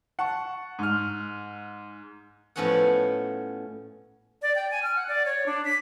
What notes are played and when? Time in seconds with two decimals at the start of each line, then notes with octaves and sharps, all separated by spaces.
0.19 F#5 A5 C#6
0.79 G#2 F6
2.56 A2 F3 B3 C#4 C#5 F#5
4.42 D5
4.56 G5
4.71 G#5
4.83 F6
4.96 F#5
5.08 D5
5.25 C#5
5.46 D4
5.65 B6